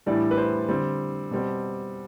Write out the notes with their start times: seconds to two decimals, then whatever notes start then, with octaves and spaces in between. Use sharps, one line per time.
0.06 A2 E3 G3 D4 D5
0.31 B4
0.38 C5
0.69 D3 G3 C4
1.31 B2 G3 C4